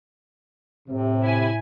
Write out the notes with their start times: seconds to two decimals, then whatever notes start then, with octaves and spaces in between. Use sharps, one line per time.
0.89 A2 C3
1.23 E4 G#5